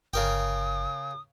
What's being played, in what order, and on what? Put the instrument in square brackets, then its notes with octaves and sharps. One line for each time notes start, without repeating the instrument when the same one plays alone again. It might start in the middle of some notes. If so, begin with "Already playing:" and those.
[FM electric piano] G1 [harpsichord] C#3 A#4 G5 [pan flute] D#6